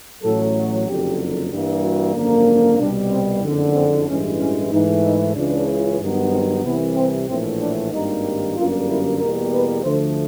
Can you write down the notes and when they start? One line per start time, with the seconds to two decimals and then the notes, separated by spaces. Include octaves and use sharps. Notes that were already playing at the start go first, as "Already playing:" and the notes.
0.23 A1 A2 F#3 A4
0.87 F#1 F2 D3 F#3 G4
1.51 G2 E3 G3 A#3
1.83 F#4
2.15 G#1 F#2 D3 F3 A#3
2.79 C2 B2 G3 D4
3.11 C4
3.43 F#1 F2 D3
3.75 C4
4.07 A1 G2 E3 G#3 C#4
4.39 C#4
4.72 G#2 E3 A3 D#4
5.04 D#4
5.36 C#2 C#3 E3 D4
6.01 G2 D#3 F#3 B3
6.31 C4
6.64 C2 C3 E3 B3
6.96 C4
7.28 A#1 A2 E3 A3 C4
7.61 D4
7.92 G#1 G2 D#3 G3 A#3 D#4
8.56 G1 F#2 D3 G3 A#3 F4
8.88 E4
9.20 E2 B2 G3 A#3 A#4
9.53 B4
9.84 D2 D3 F3 A3 C5